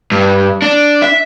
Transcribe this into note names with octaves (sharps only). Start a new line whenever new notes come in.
G2
D4
E5